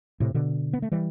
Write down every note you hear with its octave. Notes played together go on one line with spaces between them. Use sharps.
A2 C3
B2 D3
B3
A3
E3 G3